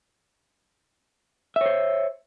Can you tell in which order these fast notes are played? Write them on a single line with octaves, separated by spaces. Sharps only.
E5 C#5 C5